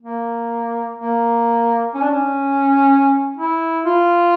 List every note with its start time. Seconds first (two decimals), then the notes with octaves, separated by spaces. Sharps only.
0.02 A#3
0.99 A#3
1.94 C#4
2.02 D4
2.10 C#4
3.37 E4
3.85 F4